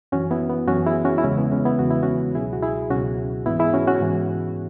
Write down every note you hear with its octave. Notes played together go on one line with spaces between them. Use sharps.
F#2 E3 C#4 F#4
B3 E4
B3
F#2 E3 C#4 F#4
E4 G#4
C#4 F#4
E4
E2 C#3 E3 G#3 C#4
B3
G#3 C#4
B3 E4
E2 C#3 E3 F#4
E4
C#4 F#4
C#2 B2 F#3 E4 G#4
F#4
E4 G#4
C#2 B2 F#3 C#4 F#4
G#2 E3 B3 E4
E4 G#4
C#4 F#4
C#4 F#4
G#2 E3